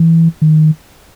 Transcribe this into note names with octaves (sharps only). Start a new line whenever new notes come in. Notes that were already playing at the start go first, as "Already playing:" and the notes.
Already playing: E3
D#3